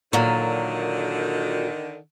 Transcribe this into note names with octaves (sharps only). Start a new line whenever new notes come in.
A#2 D3 D#3 F#3